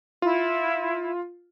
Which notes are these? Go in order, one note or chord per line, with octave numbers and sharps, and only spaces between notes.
E4 F4